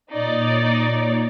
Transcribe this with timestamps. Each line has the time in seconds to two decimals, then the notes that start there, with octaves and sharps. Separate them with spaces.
0.11 A#2 D#4 C#5 D5